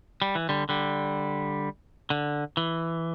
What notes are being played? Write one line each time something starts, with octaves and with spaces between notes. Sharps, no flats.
G3
E3
D3 G3
D3 G3
D3
E3